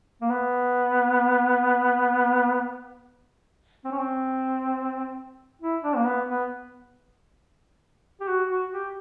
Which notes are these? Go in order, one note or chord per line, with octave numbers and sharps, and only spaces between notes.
A#3
B3
C4
C#4
C4
E4
D4
A#3
B3
B3
G4
F#4
F#4
G4